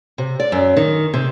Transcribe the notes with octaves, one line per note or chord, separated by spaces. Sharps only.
C3
D5
F#2
D#3
C3